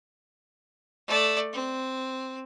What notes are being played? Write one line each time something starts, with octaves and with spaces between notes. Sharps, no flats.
A3 D5
C4